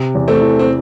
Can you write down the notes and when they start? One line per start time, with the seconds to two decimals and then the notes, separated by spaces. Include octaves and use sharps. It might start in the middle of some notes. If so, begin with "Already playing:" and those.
Already playing: C3
0.15 E2
0.28 A3 C4
0.41 E3
0.59 C4